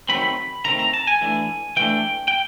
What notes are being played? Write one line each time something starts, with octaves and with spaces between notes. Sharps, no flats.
D#3 F#3 A3 C4 B5
D#3 F#3 A3 C4 A#5
A#5
A5
G#5
E3 A3 D4
E3 A3 D4 G5
G5